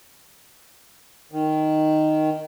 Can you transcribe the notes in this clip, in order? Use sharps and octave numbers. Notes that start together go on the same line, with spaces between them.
D#3